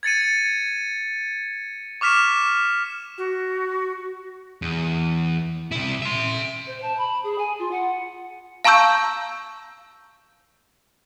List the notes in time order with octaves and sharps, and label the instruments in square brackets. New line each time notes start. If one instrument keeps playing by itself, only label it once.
[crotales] G#6 A6 C#7 D#7
C#6 D6 F6 B6 E7
[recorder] F#4
[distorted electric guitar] E2
C3 E4
E5 C6
[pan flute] C5
A5
B5
G#4
G#5
F4
F#5
[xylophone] F5 A5 A#5 C#6 E6 G6